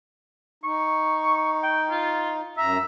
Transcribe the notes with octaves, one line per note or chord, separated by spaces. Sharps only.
D#4 C#6
G5
F4
F#2 E5 A#5